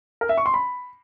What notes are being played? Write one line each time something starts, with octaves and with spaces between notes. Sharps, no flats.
A#4
E5
C#6
C6
B5